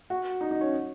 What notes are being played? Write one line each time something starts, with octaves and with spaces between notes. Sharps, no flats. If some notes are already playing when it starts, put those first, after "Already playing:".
F#4
D#4
D#4
C#4